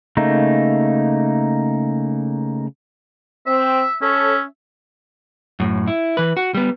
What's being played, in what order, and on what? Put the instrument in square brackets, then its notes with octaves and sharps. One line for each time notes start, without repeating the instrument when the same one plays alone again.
[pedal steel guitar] C#3 A3 A#3 D#4
[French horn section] C4 [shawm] E5
[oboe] C#4 [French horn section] A4 C#5 [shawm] E5
[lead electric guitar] F#2 A2
E4
E3 B4
F#4
G3 B3